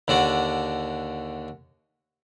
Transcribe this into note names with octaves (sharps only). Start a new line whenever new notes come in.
D#2 D3 D4 F#4 F#5